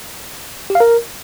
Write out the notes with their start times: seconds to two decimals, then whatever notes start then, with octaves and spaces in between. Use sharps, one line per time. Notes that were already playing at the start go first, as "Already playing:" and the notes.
0.70 G4
0.75 F5
0.80 A#4